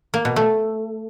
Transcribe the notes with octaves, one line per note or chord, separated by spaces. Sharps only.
A#3
B2
A3